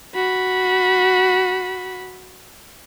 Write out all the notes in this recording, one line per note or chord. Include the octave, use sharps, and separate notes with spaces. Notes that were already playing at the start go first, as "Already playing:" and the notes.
F#4 B5